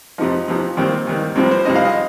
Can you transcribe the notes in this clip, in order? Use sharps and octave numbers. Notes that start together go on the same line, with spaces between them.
F2 C3 F3 D#4
F2 C3 F3
D#2 D#3 G3 C4
D#2 D#3 G3
C2 C3 F3 C4
C5
C2 C3 F3 D#5
F5
D#5